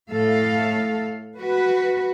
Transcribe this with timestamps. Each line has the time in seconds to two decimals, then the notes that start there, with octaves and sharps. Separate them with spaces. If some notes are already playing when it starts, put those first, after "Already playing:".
0.12 A2 A4 F5
1.39 F#4 B4